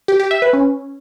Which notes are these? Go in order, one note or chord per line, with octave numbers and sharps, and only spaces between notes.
G4
G4
E5
B4
C#4